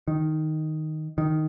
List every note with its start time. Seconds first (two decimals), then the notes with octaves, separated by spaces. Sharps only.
0.08 D#3
1.18 D#3